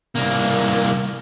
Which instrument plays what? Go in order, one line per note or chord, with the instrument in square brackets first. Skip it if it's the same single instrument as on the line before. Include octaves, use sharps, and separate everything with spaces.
[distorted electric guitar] C2 A#3